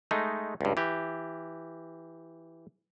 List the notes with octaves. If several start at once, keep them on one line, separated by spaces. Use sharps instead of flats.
G#3 A3 D#4
C#2 G2
E3 G4